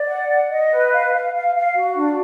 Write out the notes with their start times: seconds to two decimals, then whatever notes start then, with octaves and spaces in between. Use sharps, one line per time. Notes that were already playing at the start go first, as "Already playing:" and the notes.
Already playing: D5
0.08 F#5
0.29 F#5
0.50 D#5
0.71 B4
0.92 F5
1.12 F5
1.34 F5
1.55 F5
1.76 F#4
1.96 D4